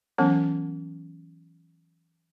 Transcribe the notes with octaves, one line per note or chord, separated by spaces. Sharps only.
E3 F#3 B3 C#4